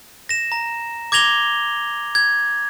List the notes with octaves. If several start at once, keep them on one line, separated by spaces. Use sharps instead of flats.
A#6 E7
A#5
D6 G#6 A#6 F7 G7
G#6